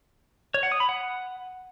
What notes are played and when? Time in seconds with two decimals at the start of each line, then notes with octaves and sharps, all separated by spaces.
0.54 C#5
0.63 F#5
0.72 D#6
0.80 B5
0.89 F#5